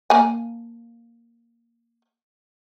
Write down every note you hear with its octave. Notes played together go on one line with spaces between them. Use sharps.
A#3 G#5